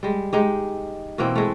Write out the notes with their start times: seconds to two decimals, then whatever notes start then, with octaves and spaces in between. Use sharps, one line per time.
0.03 G3 G#3
0.33 G#3 D#4 G4
1.18 B2 E3 A#3 C4
1.35 G#3 A3